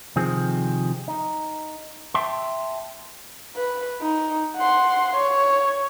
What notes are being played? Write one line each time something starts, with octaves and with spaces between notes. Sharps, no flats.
C3 D#3 F3 C4 G#4
D#4
E5 G5 A5 C6
B4
D#4
F#5 C6
C#5